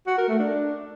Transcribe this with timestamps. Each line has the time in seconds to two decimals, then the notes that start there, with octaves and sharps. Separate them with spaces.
0.07 F#4
0.18 A#4
0.28 A3
0.39 D4